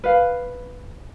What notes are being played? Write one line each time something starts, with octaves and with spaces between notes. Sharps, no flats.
B4 F5